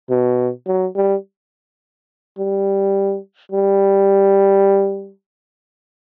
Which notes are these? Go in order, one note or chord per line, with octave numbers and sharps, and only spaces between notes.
B2
F#3
G3
G3
G3